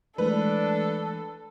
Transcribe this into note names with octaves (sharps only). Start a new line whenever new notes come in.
E3 G#3 A3 D4 A4 B4